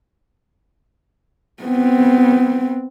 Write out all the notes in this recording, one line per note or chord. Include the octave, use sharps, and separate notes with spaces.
B3 C4